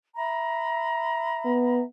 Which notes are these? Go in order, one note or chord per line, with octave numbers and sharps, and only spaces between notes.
E5 A#5 B5
B3